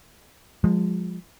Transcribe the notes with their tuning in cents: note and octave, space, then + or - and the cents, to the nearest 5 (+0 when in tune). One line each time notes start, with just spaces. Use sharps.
F3 +25 G#3 -10